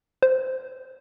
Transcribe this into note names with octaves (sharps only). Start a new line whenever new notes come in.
C5